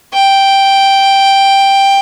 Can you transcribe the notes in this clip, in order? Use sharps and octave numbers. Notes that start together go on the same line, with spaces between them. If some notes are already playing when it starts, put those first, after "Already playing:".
G5